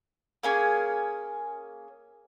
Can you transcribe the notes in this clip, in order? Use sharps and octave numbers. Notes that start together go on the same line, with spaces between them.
A#3 C#4 G#4